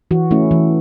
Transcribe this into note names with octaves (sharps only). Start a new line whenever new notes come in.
E3 F#4
A3 C#4 E4
E3